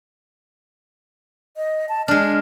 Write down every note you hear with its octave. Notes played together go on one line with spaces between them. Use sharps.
D#5
A5
G#3 D4 F6